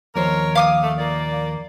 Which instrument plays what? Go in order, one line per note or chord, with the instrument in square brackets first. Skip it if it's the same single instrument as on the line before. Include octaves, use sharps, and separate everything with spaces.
[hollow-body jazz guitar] D#2 F3 C5 [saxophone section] A#4 C#5
[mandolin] F5 D6 D#6
[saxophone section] A3
A#2 A#3 D5